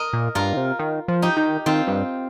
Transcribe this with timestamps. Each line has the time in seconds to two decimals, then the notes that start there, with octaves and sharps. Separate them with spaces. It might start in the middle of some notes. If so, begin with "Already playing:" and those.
Already playing: A#4 D#5
0.13 A#2
0.35 G2 F4 A#4
0.53 D#3
0.57 C3
0.79 D#3
1.08 F3
1.22 D#4 G4
1.37 D#3
1.66 D#3 C4 F4
1.87 G2